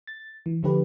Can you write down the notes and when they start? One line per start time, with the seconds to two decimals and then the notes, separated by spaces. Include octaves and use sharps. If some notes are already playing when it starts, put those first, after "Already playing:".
0.07 A6
0.46 E3
0.63 D3 F3 A3 D4 G4 B4